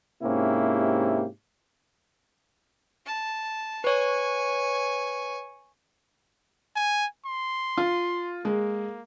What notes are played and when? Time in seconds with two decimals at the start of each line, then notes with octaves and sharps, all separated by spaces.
0.22 G#2 C3 A#3 C#4 E4 G4
3.06 A5
3.84 B4 C#5 G#5 C#6
6.76 G#5
7.26 C6
7.77 F4
8.45 G#3 A#3